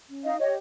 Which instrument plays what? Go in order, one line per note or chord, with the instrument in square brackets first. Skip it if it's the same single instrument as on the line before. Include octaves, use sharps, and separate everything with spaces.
[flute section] C#4
D#4 D#5 F5
G4 C#5 D#5